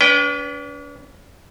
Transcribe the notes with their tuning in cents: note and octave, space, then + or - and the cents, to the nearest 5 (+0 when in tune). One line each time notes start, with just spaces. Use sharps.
D4 -45 B4 +0 G5 +0